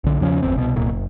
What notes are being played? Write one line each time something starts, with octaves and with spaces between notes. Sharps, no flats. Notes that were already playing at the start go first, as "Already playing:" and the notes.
B1 D3
E2 C#3 F3 C#4
G1 E2 C4
C2 B2
D1 C2 A#2
F#1